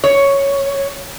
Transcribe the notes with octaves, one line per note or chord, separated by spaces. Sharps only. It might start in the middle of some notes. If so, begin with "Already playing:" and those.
C#5